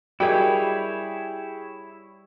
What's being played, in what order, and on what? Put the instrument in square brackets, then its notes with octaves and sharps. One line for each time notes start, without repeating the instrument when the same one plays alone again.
[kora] G3 [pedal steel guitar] E4 C#5 [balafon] F#4 A#4 D#5 [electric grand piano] G#4 G5